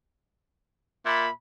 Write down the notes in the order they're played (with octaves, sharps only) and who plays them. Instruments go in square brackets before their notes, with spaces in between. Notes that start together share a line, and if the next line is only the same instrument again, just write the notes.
[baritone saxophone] A#2 [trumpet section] E5 B5